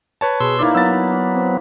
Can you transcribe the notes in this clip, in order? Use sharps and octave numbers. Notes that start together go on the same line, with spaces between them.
B4 C#5 A5
B2 G#4 C6 E6
A#3 D#4 E4 D5
F#3 B3 E6 A6
C4